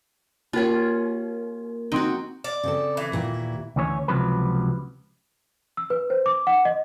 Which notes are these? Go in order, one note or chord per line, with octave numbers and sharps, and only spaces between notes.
A#3 C#4 F4 A#4
C4 D#4 F#4 G5
D5
C#3 C4 A4
E3
D#2 A#2 E4
D2 E3 C#4 G4 C#5
C#2 C3 F3 F#3 B4
E6
B4
C5
D6
F#5
D#5